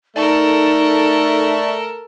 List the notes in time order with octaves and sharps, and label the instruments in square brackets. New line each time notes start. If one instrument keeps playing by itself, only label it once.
[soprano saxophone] A3 [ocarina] D#4 [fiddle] A4 A#4 [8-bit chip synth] D5 A5 C#6